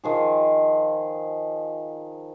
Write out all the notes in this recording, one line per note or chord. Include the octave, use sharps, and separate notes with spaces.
D#3 F3 G#4